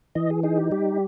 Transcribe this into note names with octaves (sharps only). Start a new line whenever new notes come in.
E3 D#5
G#4
D#4 G#4
G4
G3 G4